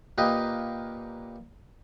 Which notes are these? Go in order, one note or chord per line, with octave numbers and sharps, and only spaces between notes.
A#2 A#3 G4 B4 D#5